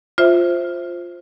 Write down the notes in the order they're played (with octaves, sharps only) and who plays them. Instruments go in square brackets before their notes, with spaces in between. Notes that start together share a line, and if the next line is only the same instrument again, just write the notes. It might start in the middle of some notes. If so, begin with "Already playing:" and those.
[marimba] F4 C5 E5